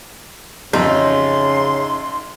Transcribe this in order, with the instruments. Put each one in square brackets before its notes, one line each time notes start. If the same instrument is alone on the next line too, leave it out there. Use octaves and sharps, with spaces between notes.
[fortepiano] A1 F2 [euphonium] C#3 [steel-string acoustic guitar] D#4 [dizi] C6